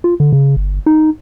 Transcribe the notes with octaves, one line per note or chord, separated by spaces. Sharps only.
F4
D3
C#3
G1
D#4